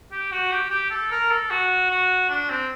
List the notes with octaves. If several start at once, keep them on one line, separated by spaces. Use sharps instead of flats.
G4
F#4
G4
G4
A4
A#4
A4
F#4
F#4
D4
C4